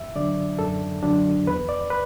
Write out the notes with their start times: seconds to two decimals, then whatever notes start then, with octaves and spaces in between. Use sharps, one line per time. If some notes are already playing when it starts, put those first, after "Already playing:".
Already playing: F#2 E5
0.15 D3 F#3 D4 D5
0.59 F#2 A4
1.03 D3 F#3 D4
1.47 E2 B4
1.69 D5
1.90 B4